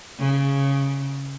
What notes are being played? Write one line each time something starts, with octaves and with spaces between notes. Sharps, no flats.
C#3